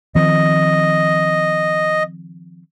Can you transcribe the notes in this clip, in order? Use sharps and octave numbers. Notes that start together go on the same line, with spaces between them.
D#3 F3 C4 D#5